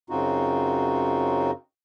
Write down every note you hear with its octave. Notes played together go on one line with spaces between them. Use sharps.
F#2 C#3 C4 D#4 F4 F#4